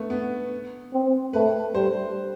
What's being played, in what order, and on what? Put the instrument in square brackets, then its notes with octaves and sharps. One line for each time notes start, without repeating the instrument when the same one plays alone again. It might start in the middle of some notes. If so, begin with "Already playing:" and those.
Already playing: [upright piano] A3 B3
B3
[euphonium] C4
[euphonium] A3 [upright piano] B4
[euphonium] G3 [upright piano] C5